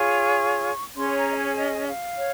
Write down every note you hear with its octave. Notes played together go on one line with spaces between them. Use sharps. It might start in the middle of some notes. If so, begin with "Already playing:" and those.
Already playing: F4 G#4 C#5 C#6
C#4 G#4 C#5 C6
A#5
D#5
C#5
D#5
F5
C#5